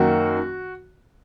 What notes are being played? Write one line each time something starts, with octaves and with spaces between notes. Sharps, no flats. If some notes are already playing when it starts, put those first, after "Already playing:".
Already playing: F#2 D#3 F#3 A#3 F#4